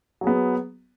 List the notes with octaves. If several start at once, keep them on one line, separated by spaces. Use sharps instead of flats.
F#3 B3 G#4